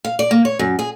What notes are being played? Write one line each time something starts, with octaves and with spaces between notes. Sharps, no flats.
F5
D5
A#3
C#5
F#2
G#4